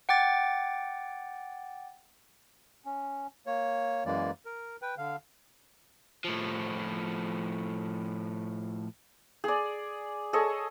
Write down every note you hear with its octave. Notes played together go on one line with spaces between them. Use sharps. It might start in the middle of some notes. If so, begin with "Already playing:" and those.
F#5 G5 D6 A6
C#4
A#3 C#5
F#2 E3 G#3 A#3 D5
A#4
B4 G5
D3 F5
A2 F3
G#4 D5
G#4 A4 C#5 D#5